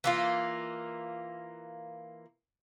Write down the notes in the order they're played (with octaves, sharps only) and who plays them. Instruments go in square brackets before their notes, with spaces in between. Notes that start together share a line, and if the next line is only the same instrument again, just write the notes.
[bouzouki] E3 A#3 F4